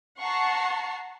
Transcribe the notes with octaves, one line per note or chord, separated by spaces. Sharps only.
F#5 A5 A#5 C#6 C7